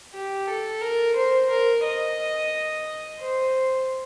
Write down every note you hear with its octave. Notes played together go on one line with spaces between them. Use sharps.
G4
A4
A#4
C5
A#4
D#5
C5